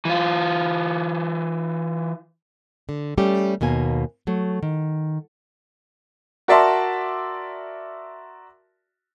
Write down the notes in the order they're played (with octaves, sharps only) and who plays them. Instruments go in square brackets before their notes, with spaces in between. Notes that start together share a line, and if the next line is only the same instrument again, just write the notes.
[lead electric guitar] E3 F4
[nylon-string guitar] D3
G3 A3 C#4 G4
D#2 B2 A#3 G#5
F#3 A3
D#3
[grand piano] F#4 A#4 D5 E5 A5 C6